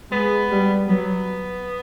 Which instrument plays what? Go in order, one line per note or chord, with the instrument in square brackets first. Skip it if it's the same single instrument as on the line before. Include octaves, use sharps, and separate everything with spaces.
[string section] G#3 [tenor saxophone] B3
[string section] G3
[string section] F#3 [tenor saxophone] B3